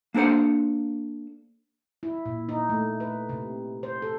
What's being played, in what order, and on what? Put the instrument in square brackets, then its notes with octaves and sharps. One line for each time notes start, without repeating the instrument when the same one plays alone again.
[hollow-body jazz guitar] A#3 D4 A4 C5 F#5
[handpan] E4
A#2
D#4
A3
B4
C3
C5
A4